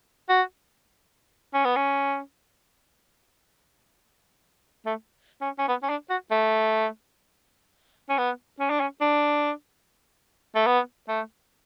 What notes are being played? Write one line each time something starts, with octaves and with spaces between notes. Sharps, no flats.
F#4
C#4
B3
C#4
A3
C#4
C#4
B3
C#4
D4
F#4
A3
C#4
B3
C#4
D4
C#4
D4
A3
B3
A3